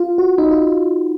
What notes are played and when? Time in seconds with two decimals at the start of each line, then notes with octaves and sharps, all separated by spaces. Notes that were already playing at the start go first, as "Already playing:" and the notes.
Already playing: F4
0.18 F#4
0.38 D#4
0.51 F4